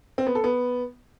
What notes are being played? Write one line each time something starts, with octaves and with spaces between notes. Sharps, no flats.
C4
B3
A4
B3